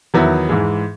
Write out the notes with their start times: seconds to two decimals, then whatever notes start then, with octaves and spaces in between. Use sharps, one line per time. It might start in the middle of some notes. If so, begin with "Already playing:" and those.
0.14 E2 D#3 F#3 B3 E4
0.49 G#2 E3 G#3